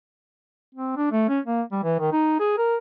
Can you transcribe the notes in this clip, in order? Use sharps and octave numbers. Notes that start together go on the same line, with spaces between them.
C4
D4
A3
C#4
A#3
G3
E3
D#3
D#4
G#4
A#4